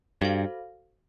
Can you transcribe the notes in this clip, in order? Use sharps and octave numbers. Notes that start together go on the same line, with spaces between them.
G2 F#4 A4 C5 F5